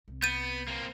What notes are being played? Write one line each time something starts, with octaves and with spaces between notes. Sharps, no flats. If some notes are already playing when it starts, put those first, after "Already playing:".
C2
B3 G6 A6 D#7
A#3 C4